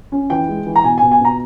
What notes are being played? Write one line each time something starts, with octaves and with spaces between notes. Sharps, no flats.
C#4
E3 G5
G#3
E3
A#5
B2 G#5
G#5
B2
G#5
B2 A#5